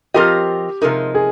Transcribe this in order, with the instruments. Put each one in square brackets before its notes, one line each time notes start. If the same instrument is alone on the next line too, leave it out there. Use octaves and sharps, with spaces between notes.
[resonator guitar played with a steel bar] F3 C4 F4 A#4 D#5 [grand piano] G4
[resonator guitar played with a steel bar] C3 F3 G#3 D#4 [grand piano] A#4
[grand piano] G#4